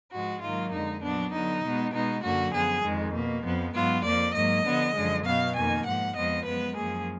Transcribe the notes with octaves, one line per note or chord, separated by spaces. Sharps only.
G#2 F3 G#3 F#4
G#2 D#3 F#3 A#3 F4
F2 D3 G#3 D#4
A#2 F#3 B3 D4
D3 F#3 B3 D#4
B2 G#3 B3
B2 G#3 B3 D#4
F#2 D3 F#3 A#3 F#4
F#2 F3 B3 G#4
F2 D#3 G#3
B2 A#3
F2 F3 B3
G#2 F#3 B3 F4
F2 F3 A#3 D5
G#2 F#3 A#3 D#5
D3 F3 B3
F#2 D3 F3 G#3
B2 F#3 B3 F5
F2 D#3 A#3 G#5
G#2 F3 A#3 F#5
F2 F3 G#3 B3 D#5
F#2 F3 G#3 B3 B4
F#2 F3 A#3 G#4